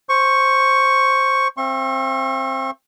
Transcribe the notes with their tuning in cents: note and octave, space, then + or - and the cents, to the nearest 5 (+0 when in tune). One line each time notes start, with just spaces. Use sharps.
C5 +10 C#6 +0
C4 +15 F5 -45 C#6 -40